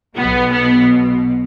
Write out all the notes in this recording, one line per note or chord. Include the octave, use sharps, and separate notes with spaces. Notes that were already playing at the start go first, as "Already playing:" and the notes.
B1 B2 B3
B3